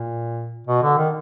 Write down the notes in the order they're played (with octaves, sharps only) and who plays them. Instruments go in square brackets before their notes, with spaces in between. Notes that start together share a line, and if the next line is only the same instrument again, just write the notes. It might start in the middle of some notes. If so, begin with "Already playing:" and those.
Already playing: [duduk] A#2
B2
D3
D#3